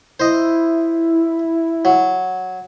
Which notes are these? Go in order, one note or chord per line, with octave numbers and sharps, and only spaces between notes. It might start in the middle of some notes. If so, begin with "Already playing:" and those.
E4 C5 D#5
F#3